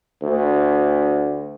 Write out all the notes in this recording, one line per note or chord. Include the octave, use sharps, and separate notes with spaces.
D2